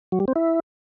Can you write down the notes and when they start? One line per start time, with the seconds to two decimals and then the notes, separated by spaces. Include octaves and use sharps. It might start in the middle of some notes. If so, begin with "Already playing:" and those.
0.12 F#3
0.20 G3
0.28 C4
0.36 E4